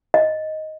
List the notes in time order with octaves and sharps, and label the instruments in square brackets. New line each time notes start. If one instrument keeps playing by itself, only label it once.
[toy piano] D#5